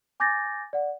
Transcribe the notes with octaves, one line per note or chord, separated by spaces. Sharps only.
G#5 D6 G6 A6 A#6
D5 F#5